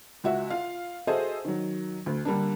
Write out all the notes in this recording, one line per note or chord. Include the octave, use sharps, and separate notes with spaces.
C#2 F#4 E5
F4 F5
F#4 G#4 A4 C5 D#5 E5
D#3 F#3
D2
D3 G3 A#3 D4